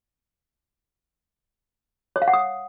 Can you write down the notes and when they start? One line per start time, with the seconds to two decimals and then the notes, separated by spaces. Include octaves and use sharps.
2.16 C#5
2.22 F5
2.28 F#5
2.33 D#6